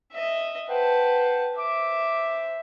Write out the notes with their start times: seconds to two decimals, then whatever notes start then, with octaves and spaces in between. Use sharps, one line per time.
0.12 D#5 E5
0.69 B4 C5 F#5 G5 A5
1.57 C5 E5 D6